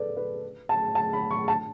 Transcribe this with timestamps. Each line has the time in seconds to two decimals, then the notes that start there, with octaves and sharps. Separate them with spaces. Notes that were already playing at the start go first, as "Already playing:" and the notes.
Already playing: A4 B4 D5
0.17 B4
0.69 A5
0.95 A5
1.13 B5
1.31 C#6
1.48 A5